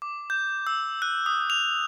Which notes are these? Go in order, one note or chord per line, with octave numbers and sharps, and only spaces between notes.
D6
G6
E6
F#6
D#6
F7